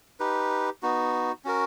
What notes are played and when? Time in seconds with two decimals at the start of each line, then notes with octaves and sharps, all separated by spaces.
0.20 D#4 G4 B4
0.82 B3 D#4 F#4
1.44 C#4 F#4 A#4